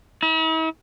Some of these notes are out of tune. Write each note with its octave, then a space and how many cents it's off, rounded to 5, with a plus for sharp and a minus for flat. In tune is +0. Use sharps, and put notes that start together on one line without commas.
E4 -45